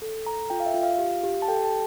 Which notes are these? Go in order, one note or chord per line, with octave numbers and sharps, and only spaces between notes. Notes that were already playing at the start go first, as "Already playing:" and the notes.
A4
A4 A#5
F4 G5
F5
E5
F4
F5
G4
G4
A5
A4 G5
A5